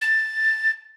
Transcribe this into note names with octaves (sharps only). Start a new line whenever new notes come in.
A6